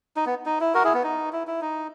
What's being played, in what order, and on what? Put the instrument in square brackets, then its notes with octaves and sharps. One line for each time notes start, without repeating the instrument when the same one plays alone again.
[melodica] D#4
B3
D#4
E4
F#4 A#4
E4 G#4
B3
D#4
E4
E4
D#4